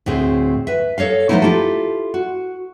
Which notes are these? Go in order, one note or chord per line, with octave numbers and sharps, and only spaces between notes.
D2 A2 C4 G#4
B4 E5
A4 C#5 D#5 F5
F3 A3 B3 C#4 D#4 E4
E4 F4 G4 A4
F#4